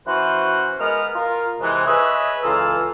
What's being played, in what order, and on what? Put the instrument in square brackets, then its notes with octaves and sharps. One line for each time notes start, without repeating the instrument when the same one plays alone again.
[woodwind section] E3 C#4 F#4 B4 C5
G#3 B3 A#4 F6
F4 A#4
C3 E3 G#3
G#4 B4 C#5 D#5 E5
C#2 E3 F4 A4 A#5 E6